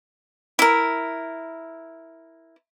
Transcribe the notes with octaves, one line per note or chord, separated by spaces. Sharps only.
E4 A#4